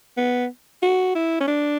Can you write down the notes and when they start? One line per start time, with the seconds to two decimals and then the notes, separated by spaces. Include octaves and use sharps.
0.17 B3
0.82 F#4
1.15 E4
1.40 C#4
1.48 D4